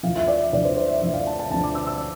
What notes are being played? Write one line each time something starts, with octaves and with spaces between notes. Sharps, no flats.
D2 D3 F3 F5
E5
D5
E5
D2 D3 F3 D5
C5
C5
E5
D2 D3 F3 E5
F5
A5
A5
D2 D3 F3 A5
D6
E6
E6